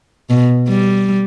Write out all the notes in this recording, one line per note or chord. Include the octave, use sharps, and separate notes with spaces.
B2
G3